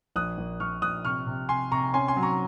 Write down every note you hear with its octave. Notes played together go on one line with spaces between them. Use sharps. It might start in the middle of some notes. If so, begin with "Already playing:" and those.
A#1 D#6 F#6
A#1
A#1 C#6 F6
A#1 D#6 F#6
C3 C#6 F6
C3
C3 G#5 C6
C3 A#5 C#6
C#4 G#5 C6
G#5 C6
F#3
A#5 C#6